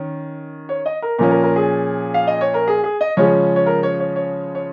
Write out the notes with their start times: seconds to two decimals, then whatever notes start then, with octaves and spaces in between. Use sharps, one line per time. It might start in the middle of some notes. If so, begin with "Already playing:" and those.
Already playing: D#3 C#4
0.69 C#5
0.86 D#5
1.02 A#4
1.18 A#2 F3 C#4 A#4
1.31 A#4
1.43 A#4
1.56 G#4
2.14 F5
2.27 D#5
2.41 C#5
2.54 A#4
2.67 G#4
2.84 G#4
3.01 D#5
3.17 C#3 F3 G#3 C#4 C#5
3.56 C#5
3.66 A#4
3.83 C#5
4.00 C#5
4.16 C#5
4.55 C#5